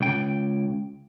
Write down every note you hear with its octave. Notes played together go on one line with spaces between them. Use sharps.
C#2 G5